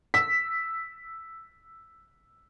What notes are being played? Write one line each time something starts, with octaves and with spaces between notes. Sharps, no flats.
E6 B6